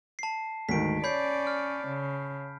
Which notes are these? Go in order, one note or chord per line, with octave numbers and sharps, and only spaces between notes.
A5 C7
D2 G#2 D#3 B6 D7
C#4 C#5 D5 B5 G6 C7
F6
C#3